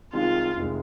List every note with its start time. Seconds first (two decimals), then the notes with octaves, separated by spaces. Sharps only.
0.13 C2 C3 D#3 G#3 D#4 F4
0.56 F1 D#3 G#3